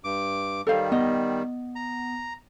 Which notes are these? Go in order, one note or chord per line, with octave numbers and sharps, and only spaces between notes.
G2 D6
D#3 G3 A4 C5 F5
B3 D#5
A#5